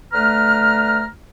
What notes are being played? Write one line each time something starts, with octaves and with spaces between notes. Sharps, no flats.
D3 A3 B4 A#5 F6